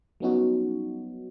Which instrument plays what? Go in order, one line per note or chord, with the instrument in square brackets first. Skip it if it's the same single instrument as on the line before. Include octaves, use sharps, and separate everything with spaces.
[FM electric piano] F#3 G3 B3 C#4 D#4 F#4